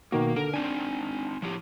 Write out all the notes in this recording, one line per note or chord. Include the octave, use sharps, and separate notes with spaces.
B2 D#3 A#3 F#4
D3 A#4
C4 D4 D#4 G#5
F3 E4 G4